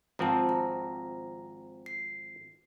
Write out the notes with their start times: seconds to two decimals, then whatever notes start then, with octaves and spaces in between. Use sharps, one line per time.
0.19 G#1 F3 C4 A5 A#5
0.49 A#5
1.86 C7